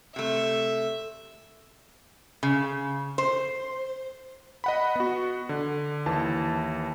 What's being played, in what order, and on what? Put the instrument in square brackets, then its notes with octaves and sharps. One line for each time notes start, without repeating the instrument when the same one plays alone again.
[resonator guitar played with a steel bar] C3 A3 [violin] E5
[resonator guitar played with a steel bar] C#3
C5
[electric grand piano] D#5 F#5 B5
B3 F#4
D3
D#2 E3 A5